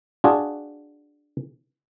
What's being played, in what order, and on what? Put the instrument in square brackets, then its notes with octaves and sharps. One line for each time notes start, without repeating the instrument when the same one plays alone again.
[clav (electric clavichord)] D4 F4 F#4 G#4